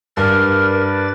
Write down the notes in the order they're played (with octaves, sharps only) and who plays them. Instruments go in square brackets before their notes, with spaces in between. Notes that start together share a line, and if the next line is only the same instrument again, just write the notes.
[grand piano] G2 [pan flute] A#4 [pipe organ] B4 D5 A6